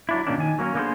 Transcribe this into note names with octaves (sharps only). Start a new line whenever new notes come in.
F#3 D4 E4
A#2 D3 D#3 A#3 C#4 D4
D#3 G#5
F#3 A#3 C4 C#4
D3 A#3 B3 G4 G#4 C5